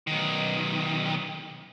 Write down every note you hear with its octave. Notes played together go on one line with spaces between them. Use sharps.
B1 D#3